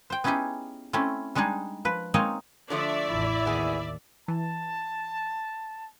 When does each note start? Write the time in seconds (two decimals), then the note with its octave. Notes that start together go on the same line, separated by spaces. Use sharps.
0.10 C5 G5
0.24 B3 C#4 D#4 E4 G4 G#4
0.93 A3 C4 C#4 E4
1.35 G3 G#3 D4 D#4 G#4
1.85 F3 B4
2.14 G#3 A#3 C4 D#4 C#5 D#5
2.70 D3 F3 A3 D5 E5
3.09 A1 E2 E4
3.46 D#2 B3 G#4
4.28 E3 A5